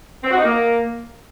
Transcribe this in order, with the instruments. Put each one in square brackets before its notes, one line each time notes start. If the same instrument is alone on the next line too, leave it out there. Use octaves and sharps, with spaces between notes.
[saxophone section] C4
F#4
D#4
A#3